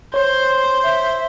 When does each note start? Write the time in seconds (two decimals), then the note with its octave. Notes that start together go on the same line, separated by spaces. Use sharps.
0.14 C5 C#5
0.84 E5